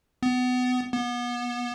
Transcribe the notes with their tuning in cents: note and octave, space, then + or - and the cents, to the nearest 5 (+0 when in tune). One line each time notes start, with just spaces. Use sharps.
B3 +25
B3 -30